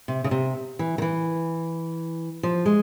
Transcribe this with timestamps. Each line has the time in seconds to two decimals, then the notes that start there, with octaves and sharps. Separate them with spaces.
0.08 C3
0.24 C#3
0.31 C3
0.79 E3
0.98 D#3
1.02 E3
2.43 F3
2.66 G#3